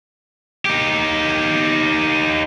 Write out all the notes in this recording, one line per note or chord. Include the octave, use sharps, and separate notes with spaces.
D#4 G4